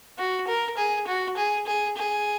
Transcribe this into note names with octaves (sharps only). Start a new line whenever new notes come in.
F#4
A#4
G#4
F#4
G#4
G#4
G#4